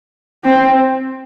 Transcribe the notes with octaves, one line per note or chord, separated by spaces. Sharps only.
C4